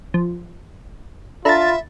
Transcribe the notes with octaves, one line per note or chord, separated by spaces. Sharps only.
F3
D4 F4 A4 E5 A#5 B5 A6